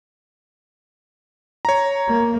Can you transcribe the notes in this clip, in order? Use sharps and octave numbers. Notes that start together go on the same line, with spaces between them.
C#5 A#5
A#3